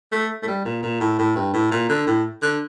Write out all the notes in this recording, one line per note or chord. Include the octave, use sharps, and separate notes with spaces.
A3
A3
G3
A#2
A#2
A2
A2
G2
A2
A#2
D3
A2
D3